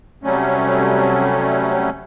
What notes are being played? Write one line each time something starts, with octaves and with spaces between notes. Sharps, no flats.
C3 F#3 G3 A3 C#4